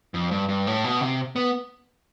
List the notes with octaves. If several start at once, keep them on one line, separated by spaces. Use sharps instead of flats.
F2
G2
G2
A2
B2
C3
B3